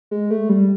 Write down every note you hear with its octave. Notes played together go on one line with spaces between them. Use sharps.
G#3
A3
G3